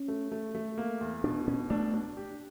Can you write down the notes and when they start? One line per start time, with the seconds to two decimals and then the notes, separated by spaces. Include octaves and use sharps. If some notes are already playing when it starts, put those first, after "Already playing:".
Already playing: C#4
0.08 A3
0.31 A3
0.55 A3
0.78 A#3
1.01 E2
1.24 B2 D4
1.47 B2 C#4
1.70 A3 D4
1.94 D4
2.17 G4